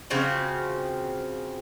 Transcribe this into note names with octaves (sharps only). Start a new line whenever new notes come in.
C#3 F3 C4 F#4